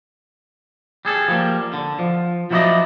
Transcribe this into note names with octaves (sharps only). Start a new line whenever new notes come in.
G3 G#4 A4
F3 G3 G#3 A#3
D3
F3
F3 F#3 E4 B4 D5 D#5